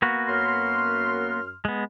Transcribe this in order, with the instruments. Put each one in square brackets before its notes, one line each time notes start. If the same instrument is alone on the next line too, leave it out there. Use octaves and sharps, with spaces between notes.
[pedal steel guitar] A#3 B3 F#4
[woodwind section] F#2 C6 F6
[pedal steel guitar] G#3 B3